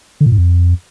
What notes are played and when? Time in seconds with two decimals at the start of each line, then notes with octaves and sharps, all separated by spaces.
0.21 D3
0.26 A#2
0.32 G#2
0.37 F2